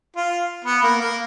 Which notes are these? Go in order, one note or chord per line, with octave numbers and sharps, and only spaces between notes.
F4
B3
A#3
A#3